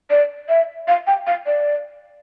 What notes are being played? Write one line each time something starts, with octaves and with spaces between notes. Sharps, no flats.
D5
E5
F5
G5
F5
D5